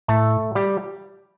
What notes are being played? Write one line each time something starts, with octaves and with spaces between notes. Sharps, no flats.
A2 A3 A4
G3 G4